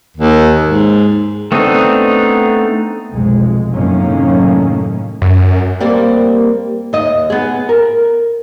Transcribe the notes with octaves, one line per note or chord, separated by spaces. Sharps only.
D#2
G#2
A3 B3 C4 D4 D#4
F1 B1 F2 G#3
F#2 A2 C3 D#3 A#3 C#4
F#2
G3 A#3 C4
D#2 D#5
B3 G#4
A#4